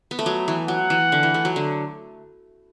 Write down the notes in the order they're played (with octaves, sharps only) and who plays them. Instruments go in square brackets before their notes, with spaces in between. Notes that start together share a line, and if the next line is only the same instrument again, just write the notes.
[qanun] B3
A3
F#3
E3
[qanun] F#3 [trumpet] F#5
[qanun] E3
D3
E3
A3
F#3
D3